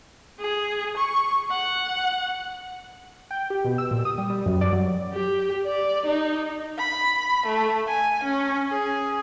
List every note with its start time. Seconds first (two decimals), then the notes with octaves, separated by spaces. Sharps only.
0.39 G#4
0.96 C#6
1.51 F#5
3.31 G5
3.50 G4
3.64 B2
3.78 E6
3.91 A#2
4.05 D#6
4.18 G3
4.30 G3
4.46 F#2
4.61 D5
4.73 F#3
5.13 G4
5.65 D5
6.06 D#4
6.78 B5
7.46 A3
7.88 G#5
8.24 C#4
8.70 G#4